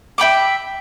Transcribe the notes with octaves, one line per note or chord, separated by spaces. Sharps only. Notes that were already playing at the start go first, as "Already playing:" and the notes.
E5 G5 B5 D6